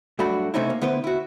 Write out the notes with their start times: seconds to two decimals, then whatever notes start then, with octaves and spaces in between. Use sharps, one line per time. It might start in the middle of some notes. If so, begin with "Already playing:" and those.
0.19 G2 F#3 A3 D4 F#4 B5
0.54 C3 A3 C4 C#4 D#4 E4
0.70 A#3
0.81 D3 B3 E4 B4 C5
1.04 E4 F#4